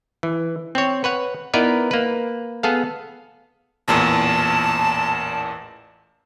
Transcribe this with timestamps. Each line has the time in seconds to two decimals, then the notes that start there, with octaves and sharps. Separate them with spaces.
0.23 E3
0.75 C4 C#5
1.04 B4 C#5 F#5
1.54 B3 D#4 E4 A#4 B4 D5
1.91 A#3 B4
2.63 B3 G#4 A4 F5
3.88 A1 E2 A#2 A5